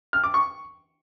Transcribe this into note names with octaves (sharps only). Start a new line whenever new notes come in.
F6
D6
C#6